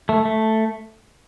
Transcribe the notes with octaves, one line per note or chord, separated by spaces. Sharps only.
A3
A3